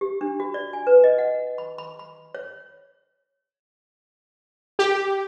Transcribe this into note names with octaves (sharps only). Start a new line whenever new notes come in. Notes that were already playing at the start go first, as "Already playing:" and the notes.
G4
D4
F#4
D5
G#5
B4
D#5
F#5
B5
B5
B5
C#5
G4